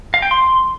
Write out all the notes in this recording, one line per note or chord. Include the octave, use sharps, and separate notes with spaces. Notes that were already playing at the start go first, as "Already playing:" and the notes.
F5
G5
C6